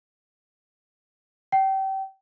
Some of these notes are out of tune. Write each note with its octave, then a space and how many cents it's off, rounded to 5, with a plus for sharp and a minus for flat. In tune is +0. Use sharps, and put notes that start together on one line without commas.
G5 -30